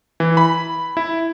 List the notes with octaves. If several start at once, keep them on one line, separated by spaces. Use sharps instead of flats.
E3
B5
E4